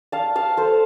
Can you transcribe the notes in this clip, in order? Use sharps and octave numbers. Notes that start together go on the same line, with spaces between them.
F5 A5
F5 A5
A4 C5